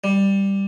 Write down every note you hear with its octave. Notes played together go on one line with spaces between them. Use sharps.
G3